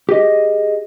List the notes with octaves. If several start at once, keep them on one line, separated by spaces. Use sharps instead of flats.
G4 G#4 D#5